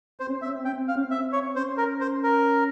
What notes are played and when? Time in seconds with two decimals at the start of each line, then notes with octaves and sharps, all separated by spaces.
0.20 C4 C5
0.29 C#4
0.37 C4
0.42 E5
0.46 C#4
0.55 C4
0.64 C#4 G5
0.73 C4
0.88 C4 F5
0.96 C#4
1.04 C4
1.11 E5
1.32 C#5
1.56 C#4 C5
1.77 A#4
2.01 C5
2.23 A#4